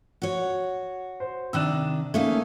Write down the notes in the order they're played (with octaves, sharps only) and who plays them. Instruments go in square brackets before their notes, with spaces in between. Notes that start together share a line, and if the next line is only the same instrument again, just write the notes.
[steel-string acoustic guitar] F#4 C#5
[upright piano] C5
[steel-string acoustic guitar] C3 D#3 D4 [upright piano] E6 F#6 E7
[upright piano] A3 A#3 [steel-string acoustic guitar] C#4 D#4 F5